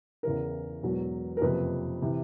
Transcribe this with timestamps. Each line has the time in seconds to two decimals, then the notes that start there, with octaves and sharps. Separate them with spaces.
0.23 E2 C#3 E3 A#4
0.83 E1 E2 B2 F#3
1.37 A#4
1.41 F#1 F2 C3 F3 B4
2.02 C3 E3